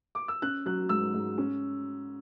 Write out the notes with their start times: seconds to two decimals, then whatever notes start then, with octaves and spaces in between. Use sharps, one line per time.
0.15 D6
0.28 E6
0.42 C#4 F#6
0.66 F#3 F#6
0.89 G#2 E6
1.14 G#2
1.38 C#4